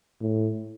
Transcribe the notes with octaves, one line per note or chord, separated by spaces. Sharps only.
A2